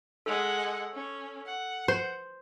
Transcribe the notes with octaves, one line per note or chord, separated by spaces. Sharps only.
G#3 A4 F#5
C#4
F#5
C5